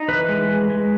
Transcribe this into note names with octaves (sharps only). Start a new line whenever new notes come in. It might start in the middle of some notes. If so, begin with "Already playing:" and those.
Already playing: D#4
E3 B4
G#3
G#3
G#3